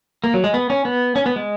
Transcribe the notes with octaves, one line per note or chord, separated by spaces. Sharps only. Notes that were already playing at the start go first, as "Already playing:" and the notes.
A#3
F#3
G#3
B3
C#4
B3
C#4
B3
G#3